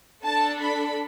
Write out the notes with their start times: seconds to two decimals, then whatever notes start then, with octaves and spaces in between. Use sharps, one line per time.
0.23 D4 A4 A5
0.62 B5